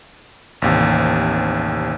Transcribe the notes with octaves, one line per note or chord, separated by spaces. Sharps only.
A1 D#2 C3